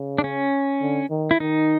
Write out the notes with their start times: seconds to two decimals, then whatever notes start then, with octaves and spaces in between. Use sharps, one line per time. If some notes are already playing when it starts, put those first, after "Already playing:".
Already playing: C#3
0.18 D4
0.24 C#4
0.81 D3
1.11 D#3
1.31 E4
1.40 D#3 D#4